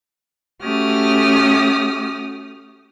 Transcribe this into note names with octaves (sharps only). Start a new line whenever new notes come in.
A3 C#4 F#4 G4 D#6 F6